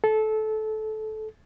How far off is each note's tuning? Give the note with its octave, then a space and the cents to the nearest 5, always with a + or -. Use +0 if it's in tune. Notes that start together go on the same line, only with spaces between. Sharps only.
A4 -20